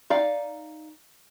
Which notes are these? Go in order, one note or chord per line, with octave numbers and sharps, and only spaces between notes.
D#4 D5 F5